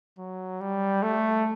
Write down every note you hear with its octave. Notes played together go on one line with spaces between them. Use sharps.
F#3
G3
A3